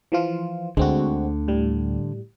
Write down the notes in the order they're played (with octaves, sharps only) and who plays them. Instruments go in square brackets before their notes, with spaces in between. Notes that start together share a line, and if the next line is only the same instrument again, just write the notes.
[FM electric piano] E3 F3 F4
[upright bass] D2 [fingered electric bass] D3 [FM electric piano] G#3 C4 F#4
[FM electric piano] A2 G3